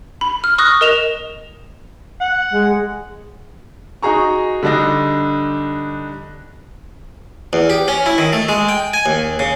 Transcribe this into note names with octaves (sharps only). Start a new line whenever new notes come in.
B5
F6
C#6 D#6 F6 F#6 A#6
A#4 D#5 E7 F7
F#5
G#3
D#4 F#4 G#4 A#5 C#6
D3 G3 D4 D#4 A#6
E2
G4
C#4
E4
D#3
A3
G#3
G5
G#5
D#2
C#3